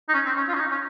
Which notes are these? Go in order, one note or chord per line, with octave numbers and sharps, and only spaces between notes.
D#4
C#4
C4
C#4
F4
C#4
D#4
C#4